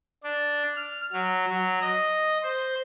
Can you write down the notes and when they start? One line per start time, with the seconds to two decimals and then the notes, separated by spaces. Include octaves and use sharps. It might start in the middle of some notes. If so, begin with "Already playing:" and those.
0.24 D4
0.76 F6
1.12 F#3
1.49 F#3
1.82 D#5
2.43 C5